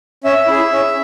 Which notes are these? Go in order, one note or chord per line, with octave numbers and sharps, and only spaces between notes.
C#4 E5
E4 G#4
C#4